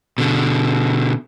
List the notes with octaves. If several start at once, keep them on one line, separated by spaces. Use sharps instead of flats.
B2 D3